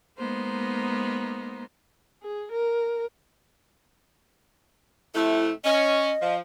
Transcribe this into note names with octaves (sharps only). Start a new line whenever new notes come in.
G#3 A#3 B3 D#4 C5
G#4
A#4
F2 C3 A3 E4
C#4 D#5
F3